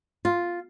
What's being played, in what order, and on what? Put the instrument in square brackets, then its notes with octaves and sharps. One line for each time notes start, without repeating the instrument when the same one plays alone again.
[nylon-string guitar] F4